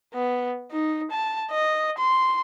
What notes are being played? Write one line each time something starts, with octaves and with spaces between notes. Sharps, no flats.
B3
D#4
A5
D#5
C6